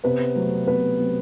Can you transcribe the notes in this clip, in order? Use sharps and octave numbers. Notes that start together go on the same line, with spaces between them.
C3 B3 B4
F#3 A3 C4
C3 B3 B4
F#3 A3 C4